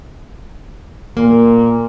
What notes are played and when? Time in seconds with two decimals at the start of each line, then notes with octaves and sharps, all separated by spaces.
1.17 A#2 A#3